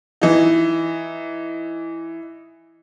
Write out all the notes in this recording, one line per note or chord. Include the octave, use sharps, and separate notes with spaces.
E3 D#4